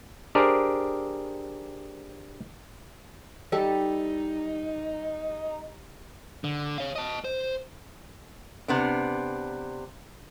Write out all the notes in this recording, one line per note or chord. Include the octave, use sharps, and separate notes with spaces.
D4 G4 G#4 A#4 C5 D5
G3 D#4 A4
D3
C#5 F5
D#5 A5
C5
C3 B3 D4